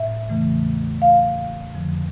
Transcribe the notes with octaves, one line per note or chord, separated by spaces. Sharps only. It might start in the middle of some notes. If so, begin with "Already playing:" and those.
Already playing: A2 E5
E2 C#3 E3 A3
F5
F2 D3 F3